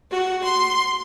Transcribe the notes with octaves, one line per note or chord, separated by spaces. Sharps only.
F#4
C6